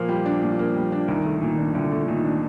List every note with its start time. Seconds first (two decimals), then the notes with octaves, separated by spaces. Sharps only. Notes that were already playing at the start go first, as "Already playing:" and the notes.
Already playing: A#2 F3 A#3
0.09 G3
0.25 D4
0.43 A#2
0.59 A#3
0.76 G3
0.92 D4
1.08 C2 D#3
1.25 A3
1.41 A#2 D#3
1.59 D4
1.75 C2 D3
1.92 A3
2.08 A#2 D#3
2.25 D4